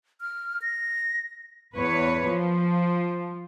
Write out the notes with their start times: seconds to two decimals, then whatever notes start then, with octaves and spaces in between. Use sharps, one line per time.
0.21 F6
0.62 A#6
1.75 E2 B4 C#5
2.28 F3